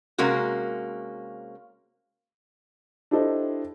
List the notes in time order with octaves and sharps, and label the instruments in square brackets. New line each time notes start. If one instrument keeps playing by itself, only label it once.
[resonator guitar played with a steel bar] C3 G#3 A#3 C#4 F#4
[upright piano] D4 E4 G4 A4 C5 D#5